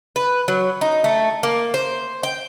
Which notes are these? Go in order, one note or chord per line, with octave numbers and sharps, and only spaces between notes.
B4
F#3
D#4
A3
A#3
C5
G5